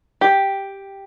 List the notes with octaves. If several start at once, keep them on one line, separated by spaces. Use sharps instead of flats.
G4